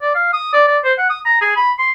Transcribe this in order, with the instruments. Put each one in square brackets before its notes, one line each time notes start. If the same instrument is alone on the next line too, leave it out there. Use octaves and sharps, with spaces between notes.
[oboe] D5
F5
D#6
D5
D5
C5
F#5
D#6
A#5
G#4
B5
C6